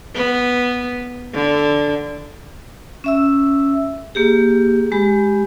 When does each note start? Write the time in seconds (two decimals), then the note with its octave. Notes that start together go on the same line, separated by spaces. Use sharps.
0.15 B3
1.34 D3
3.04 C#4 E5 E6
4.15 A#3 G4 G#4
4.92 G#3 G4 B5